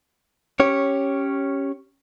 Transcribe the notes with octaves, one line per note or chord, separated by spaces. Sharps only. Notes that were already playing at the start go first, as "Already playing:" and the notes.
C#4 G4 C#5